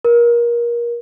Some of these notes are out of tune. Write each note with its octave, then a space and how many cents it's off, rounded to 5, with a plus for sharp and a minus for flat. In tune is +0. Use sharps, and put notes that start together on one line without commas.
A#4 +25